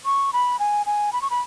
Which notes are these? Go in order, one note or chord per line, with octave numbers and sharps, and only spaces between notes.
C#6
B5
G#5
G#5
B5
C#6
B5